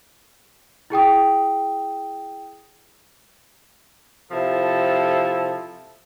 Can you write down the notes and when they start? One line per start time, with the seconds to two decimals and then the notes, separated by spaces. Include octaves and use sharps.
0.90 E4 G#4 G5 D#6
4.31 C3 F3 E4 A4